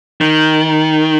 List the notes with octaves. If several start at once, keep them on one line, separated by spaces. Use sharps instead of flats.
D#3